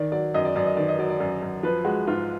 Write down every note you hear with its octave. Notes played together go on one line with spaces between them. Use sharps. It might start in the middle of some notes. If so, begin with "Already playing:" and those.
Already playing: D#3 D5
F#3 D5
F#2 D#5
D5
F#2 D5
D#5
D#3 D5
D#5
F#3 D5
D5
F#2 D5
F#2
F3 B4
G#3 F#4
G#2 F4